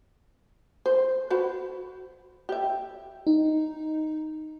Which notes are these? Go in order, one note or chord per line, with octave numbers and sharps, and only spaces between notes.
C5
F#4 B4 C5
G4 E5
D#4